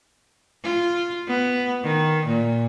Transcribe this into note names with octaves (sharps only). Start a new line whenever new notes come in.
F4
B3
D#3
A#2